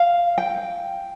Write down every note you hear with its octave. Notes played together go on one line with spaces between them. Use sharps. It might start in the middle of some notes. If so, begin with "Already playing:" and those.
Already playing: F5
G5